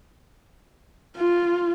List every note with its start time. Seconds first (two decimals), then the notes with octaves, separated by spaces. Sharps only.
1.17 F4